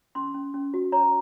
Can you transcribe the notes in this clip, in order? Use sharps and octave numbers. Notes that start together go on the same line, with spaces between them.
C#4 C6
C#4
C#4
F#4
C#5 A#5